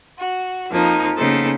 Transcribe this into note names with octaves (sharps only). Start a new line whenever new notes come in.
F#4
F2 F3 A#3 D#4
C#3 A#3 B3 D#4 A4 C5